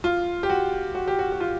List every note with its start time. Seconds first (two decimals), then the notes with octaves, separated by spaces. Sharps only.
0.04 F4
0.43 G4
0.50 F#4
0.95 F#4
1.08 G4
1.19 F#4
1.32 F#4
1.40 F4